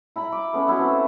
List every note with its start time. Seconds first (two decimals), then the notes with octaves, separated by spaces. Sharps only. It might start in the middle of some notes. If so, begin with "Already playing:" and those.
0.16 E4 A#5 B5
0.32 D6
0.53 A3 B3 C#4
0.67 A3 E4 F#4 A4
0.79 C4